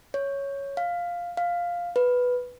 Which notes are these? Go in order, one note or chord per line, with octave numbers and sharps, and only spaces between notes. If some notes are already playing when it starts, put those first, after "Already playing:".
C#5
F5
F5
B4